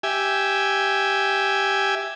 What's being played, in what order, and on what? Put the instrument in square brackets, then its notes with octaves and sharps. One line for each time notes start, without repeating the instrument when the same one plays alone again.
[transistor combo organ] G4 E5 G#5